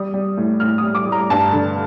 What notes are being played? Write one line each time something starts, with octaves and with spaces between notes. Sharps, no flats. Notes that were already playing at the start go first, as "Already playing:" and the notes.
Already playing: G3 D#6
G3
A2
A2 F6
D#6
G3
D6
G3
A#5
G2 A5
D3